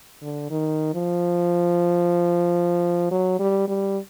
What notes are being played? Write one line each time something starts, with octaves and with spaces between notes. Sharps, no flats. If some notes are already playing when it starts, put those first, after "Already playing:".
D3
D#3
F3
F#3
G3
G3